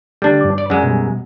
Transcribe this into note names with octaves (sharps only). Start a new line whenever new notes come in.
D3 G3 A3 D4
G2 D6
D5
F#2 G#3 D5 F#5
B2 G3